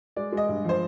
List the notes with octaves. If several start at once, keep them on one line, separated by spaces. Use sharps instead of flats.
G#3 D5
G#3 D#5
G2
F3 C5